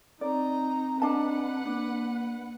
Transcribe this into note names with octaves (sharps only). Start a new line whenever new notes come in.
C4 D#4 D5 A#5
D4 B4 D#5 F#5 A5
A#3 D4